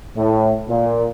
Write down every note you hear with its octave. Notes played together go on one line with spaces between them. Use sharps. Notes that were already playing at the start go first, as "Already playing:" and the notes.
A2
A#2